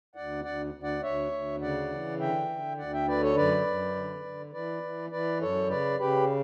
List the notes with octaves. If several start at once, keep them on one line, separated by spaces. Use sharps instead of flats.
D2 D5 F#5
D2 D5 F#5
D2
D5 F#5
D2 C#5 E5
D2
C#3 D5 F#5
E3
D3 E5 G5
D3
D2 D5 F#5
E5 G5
D3 B4 D5
A4 C#5
F#2 B4 D5
F#2
D3
D3
E3 B4 D5
E3
E3 B4 D5
F#2 A4 C#5
C#3 B4 D5
C#3 G4 B4